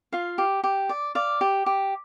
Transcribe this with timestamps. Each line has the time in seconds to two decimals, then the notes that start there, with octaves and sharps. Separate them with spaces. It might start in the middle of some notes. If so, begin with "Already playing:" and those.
0.13 F4 F5
0.38 G4
0.64 G4
0.89 D5
1.15 D5 F5
1.41 G4
1.66 G4